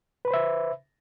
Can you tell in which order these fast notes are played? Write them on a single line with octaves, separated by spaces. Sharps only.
B4 B5 C5 E5